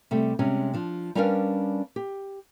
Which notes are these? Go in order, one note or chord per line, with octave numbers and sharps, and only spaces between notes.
C3 G3 A3
C3 G3 G#3 C#4
F3 D4
G3 C#4 D4 A#4 B4 F5
G4